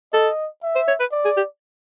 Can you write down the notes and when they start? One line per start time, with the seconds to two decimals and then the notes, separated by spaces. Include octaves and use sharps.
0.13 A4 D#5
0.63 E5
0.76 C5
0.88 C#5
1.00 B4
1.12 D5
1.25 G#4
1.37 G4